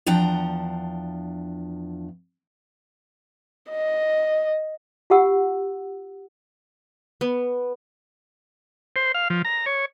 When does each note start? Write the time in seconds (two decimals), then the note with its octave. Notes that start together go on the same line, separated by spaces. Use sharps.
0.06 E2 F3 D4 F#5 G5 A#5
3.71 D#5
5.10 F4 G4 F#5 E6
7.21 B3
8.96 C5
9.14 F5
9.30 F3
9.45 A#5
9.66 C#5